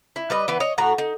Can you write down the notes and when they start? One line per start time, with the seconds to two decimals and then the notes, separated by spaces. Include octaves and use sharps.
0.16 E4
0.30 G3 B4 D#5
0.48 E3 B3 B4
0.60 C#5 D#5
0.78 A2 F#4 A#5
0.98 D#4